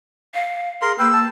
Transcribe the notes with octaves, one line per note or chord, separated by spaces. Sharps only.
F5
G#4 A#4 C6
A#3 B4 G5 E6
A5